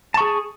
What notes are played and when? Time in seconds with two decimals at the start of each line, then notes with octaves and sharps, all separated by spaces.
0.14 A5
0.17 C#6
0.21 G#4